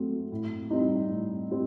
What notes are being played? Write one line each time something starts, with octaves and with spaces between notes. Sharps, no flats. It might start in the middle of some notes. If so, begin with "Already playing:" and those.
Already playing: F#3 A3 C4
A2
G3 C4 D#4
A2
G3 C4